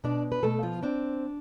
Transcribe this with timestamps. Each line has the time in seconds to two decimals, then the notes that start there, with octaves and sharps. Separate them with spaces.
0.04 B2 D4 D5
0.32 B4
0.43 B2 A3 A4
0.63 F3 F4
0.83 C4 D4